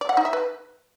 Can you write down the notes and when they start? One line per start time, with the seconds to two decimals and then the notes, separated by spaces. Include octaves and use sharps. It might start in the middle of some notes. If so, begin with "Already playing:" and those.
0.01 D5
0.09 F#5
0.17 D#4
0.25 E5
0.33 B4